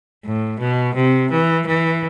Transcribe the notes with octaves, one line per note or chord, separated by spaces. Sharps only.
A2
B2
C3
E3
E3